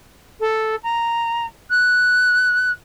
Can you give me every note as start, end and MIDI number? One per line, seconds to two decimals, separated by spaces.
0.40 0.75 69
0.83 1.45 82
1.70 2.72 90